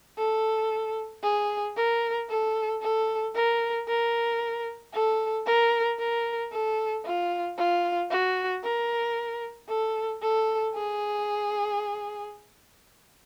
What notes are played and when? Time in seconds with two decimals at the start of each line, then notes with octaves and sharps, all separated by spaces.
0.18 A4
1.23 G#4
1.76 A#4
2.30 A4
2.82 A4
3.35 A#4
3.88 A#4
4.93 A4
5.47 A#4
5.99 A#4
6.52 A4
7.05 F4
7.58 F4
8.11 F#4
8.63 A#4
9.69 A4
10.22 A4
10.74 G#4